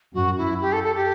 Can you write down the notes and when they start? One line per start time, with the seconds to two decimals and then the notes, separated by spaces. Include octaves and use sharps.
0.14 F#2 F#4
0.38 E4
0.61 G4
0.73 A4
0.84 A4
0.96 G4